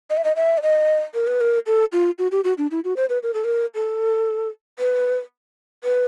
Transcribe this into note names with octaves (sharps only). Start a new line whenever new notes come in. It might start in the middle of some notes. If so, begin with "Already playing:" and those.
D#5
E5
D#5
E5
D5
D#5
A#4
B4
A#4
A4
F4
F#4
G4
F#4
D4
E4
F#4
C5
B4
A#4
A4
A#4
A4
B4
B4